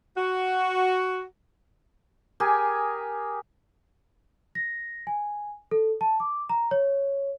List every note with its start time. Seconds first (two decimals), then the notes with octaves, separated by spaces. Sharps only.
0.16 F#4
2.40 G4 G#4 A#4 G#5
4.55 A#6
5.07 G#5
5.71 A4
6.01 A5
6.20 D6
6.50 A#5
6.71 C#5